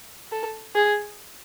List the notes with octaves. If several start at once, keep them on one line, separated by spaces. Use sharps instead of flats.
A4
G#4